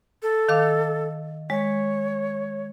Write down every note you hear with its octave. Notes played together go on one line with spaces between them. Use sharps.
A4
D#3 F5 D6
G#3 C#5